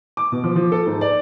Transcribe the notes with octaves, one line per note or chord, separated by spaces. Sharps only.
D6
B2
F3
F3
A4
G#2
D5